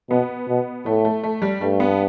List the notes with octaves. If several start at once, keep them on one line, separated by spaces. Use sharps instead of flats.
B2 B3
B2
A2 A3
A3
A3
G3
G2 A3
B3